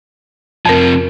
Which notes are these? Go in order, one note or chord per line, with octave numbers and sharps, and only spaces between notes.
F2 C3 F3 A#4